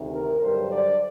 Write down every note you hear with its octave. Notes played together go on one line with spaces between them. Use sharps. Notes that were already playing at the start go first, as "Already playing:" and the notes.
Already playing: D2 C3 D#3
A#4
G2 D3 F#3 C5
D5